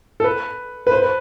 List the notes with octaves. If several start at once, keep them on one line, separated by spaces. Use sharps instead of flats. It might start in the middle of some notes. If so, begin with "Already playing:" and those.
A4
B4
B4
C5
B4